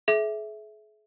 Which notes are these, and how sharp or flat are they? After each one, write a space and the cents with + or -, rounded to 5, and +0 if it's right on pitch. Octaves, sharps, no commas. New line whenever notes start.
G#4 +40 E5 -5